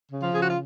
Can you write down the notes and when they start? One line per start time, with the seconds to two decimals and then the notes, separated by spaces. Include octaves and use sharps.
0.11 C#3
0.22 F3 F4
0.33 C#3 G#4
0.41 F#4
0.50 F4